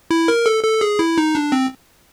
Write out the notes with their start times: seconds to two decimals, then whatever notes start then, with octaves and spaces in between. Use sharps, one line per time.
0.11 E4
0.28 A#4
0.46 A4
0.64 A4
0.81 G#4
0.99 E4
1.18 D#4
1.35 D4
1.52 C4